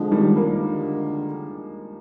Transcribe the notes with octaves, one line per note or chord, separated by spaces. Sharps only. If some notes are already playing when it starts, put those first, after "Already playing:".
Already playing: D3 F3 G#3
D#3 G3
G3 A#3
D3